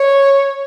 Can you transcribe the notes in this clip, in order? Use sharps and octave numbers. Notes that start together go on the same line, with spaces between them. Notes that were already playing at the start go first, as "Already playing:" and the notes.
Already playing: C#5